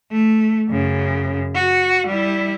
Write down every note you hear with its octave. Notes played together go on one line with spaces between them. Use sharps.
A3
F#2 C#3
F#4
G3 E4